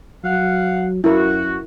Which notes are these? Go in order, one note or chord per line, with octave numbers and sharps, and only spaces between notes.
F#3 F5 F#5
F#2 E4 F#4 A#4